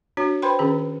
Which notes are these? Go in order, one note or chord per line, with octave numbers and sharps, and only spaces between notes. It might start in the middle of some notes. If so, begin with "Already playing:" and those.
D4 F#4 C#5
B4 C5 G5 B5 C6
D#3 C#4 G#4